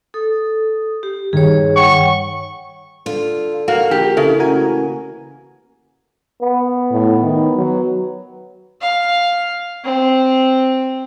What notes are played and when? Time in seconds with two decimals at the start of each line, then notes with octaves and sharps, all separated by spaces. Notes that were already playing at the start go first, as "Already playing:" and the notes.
0.14 A4 D#6
1.03 G4
1.33 G2 D#3 G#4 C#5
1.76 C#5 F#5 G5 C#6
3.06 D3 F4
3.68 A#3 F#4 F5
3.91 A#1 G4
4.17 A1 C#3 A3
4.40 F#4 A#4 G#5
6.42 B3
6.91 A2
7.22 D#3
7.56 F#3
8.81 F5
9.85 C4